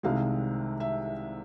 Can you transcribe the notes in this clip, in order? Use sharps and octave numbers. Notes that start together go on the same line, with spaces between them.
C2 C3 D#3 G#3 F5
E5